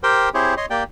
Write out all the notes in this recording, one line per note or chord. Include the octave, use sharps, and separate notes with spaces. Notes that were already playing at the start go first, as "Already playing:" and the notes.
G4 A#4 C5 G5
C4 E4 G4 G#4 C5 C#5
C#5 D#5 C6
A#3 G4 D5 G5